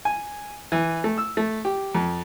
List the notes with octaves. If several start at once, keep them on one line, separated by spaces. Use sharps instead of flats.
G#5
E3
A3
E6
A3
G4
F2